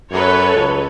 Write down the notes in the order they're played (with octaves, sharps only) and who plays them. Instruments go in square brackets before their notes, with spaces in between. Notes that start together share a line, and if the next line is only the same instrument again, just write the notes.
[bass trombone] F#2 [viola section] A4 B4 C#5
[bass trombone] C#2